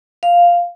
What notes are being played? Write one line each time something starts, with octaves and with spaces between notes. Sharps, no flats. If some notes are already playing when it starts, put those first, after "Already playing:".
F5